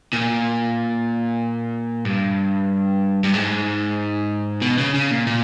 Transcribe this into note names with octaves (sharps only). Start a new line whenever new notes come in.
A#2
G2
G2
G#2
B2
C#3
C#3
A#2
A#2